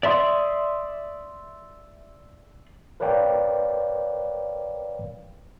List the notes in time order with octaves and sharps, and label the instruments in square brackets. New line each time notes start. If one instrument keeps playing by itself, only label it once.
[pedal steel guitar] D5 E5 C6 D#6
[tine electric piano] A#4 B4 C#5 D5 F5 G5